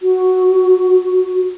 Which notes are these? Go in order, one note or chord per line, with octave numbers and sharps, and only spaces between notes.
F#4